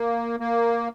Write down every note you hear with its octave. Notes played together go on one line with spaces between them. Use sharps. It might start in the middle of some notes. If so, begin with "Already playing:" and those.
Already playing: A#3
A#3